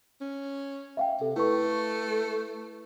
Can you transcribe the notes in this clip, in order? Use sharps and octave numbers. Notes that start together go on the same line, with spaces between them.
C#4
E5 F5 G5
C3 A4
A3 E4 B4 C#6